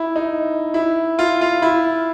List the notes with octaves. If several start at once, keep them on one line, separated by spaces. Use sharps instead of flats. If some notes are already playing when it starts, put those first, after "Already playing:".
Already playing: E4
D#4
E4
F4
F4
E4